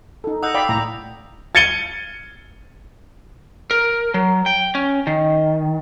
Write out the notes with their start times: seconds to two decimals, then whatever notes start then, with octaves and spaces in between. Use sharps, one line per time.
0.24 D#4 A4
0.43 D#5 F#5 D#6 E6 G6
0.54 D5 F5 G5 B5
0.69 C2 A2 A#5
1.55 G#6 A6 C#7 D#7 G7
3.71 A#4
4.14 F#3
4.46 G5
4.75 C#4
5.07 D#3